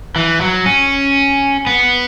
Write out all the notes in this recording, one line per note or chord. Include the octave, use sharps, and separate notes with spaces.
E3
F#3
C#4
B3